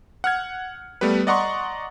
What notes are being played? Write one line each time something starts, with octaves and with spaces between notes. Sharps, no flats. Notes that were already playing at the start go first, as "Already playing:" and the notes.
F#5 F6 G#6
G3 A3 B3 G4 B4
D5 D#5 F#5 A#5 C6 C#6